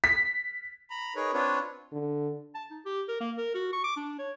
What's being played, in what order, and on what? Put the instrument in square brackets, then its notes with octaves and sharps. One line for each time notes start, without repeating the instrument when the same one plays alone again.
[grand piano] B6
[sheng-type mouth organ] A#5 B5
D#4 G#4 A#4 B4 C#5
C4 D4 F4 B4 C#5
[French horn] D3
[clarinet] A5
D#4
G4
A#4
A#3
A#4
F#4
C#6
D6
D4
C#5